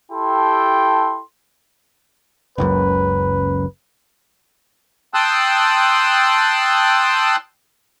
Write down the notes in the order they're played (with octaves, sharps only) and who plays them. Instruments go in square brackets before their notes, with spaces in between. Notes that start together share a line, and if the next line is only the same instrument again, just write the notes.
[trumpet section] E4 G4 A4 G5 A5 C6
[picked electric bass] F#1 C#2 F#2 [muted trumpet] B4
[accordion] G5 A5 C6 D#6 E6 F#6